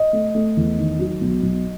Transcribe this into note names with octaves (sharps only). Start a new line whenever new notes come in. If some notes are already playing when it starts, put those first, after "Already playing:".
Already playing: D#5
A3
A3
E2
D#3
F#3
B1
B1